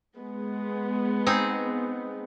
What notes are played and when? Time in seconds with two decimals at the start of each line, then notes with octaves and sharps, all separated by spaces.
0.18 G#3 B3
1.26 C4 D#4 G#4